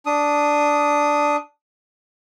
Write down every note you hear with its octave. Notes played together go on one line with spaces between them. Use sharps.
D4 D#6